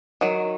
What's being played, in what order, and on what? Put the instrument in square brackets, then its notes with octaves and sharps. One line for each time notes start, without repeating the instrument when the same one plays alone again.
[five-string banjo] D#3 F#3